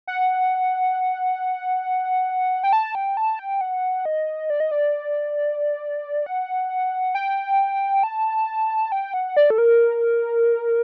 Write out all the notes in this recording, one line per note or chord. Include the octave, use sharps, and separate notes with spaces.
F#5
G5
A5
G5
A5
G5
F#5
D#5
D5
D#5
D5
F#5
G5
A5
G5
F#5
D5
A4
A#4